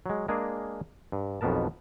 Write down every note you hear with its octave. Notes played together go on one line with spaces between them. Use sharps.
F#3 G#3
G#3 A#3 D4 G#4 A#4
G2
B1 F2 B2 B3 A#4 A5